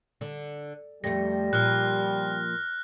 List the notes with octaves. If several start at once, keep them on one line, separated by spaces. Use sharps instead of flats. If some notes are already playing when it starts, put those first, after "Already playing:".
D3
F2 G3 A3 A#6
A#2 F3 F6 F#6